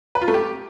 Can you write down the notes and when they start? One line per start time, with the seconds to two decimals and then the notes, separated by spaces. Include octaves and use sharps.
0.15 B4
0.22 F4
0.28 A3
0.34 G4